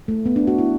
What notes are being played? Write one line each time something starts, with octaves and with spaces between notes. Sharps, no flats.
A3
B3
D4
F#4
E4